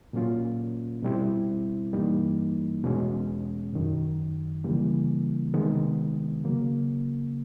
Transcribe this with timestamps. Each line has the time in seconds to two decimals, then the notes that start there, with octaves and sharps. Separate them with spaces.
0.13 A#2 F#3 A#3 C#4 F4
1.03 B2 G3 C4 E4
1.93 G2 E3 G3 A#3 D#4
2.84 E2 B2 G#3 C#4
3.73 F#2 D#3 F#3
4.64 C#3 E3 G3 A#3
5.54 C3 D#3 G#3 B3
6.44 C#3 F#3 A#3